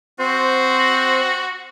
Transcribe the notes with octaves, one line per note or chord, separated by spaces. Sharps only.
C4 F#4 C5